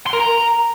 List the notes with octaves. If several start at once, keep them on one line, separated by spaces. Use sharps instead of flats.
C6
A#4
A#5